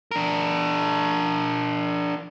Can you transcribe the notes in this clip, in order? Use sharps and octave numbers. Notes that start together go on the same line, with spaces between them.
D4 A#4